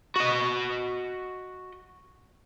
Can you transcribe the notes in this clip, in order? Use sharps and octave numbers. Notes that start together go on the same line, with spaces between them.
F#4 D#5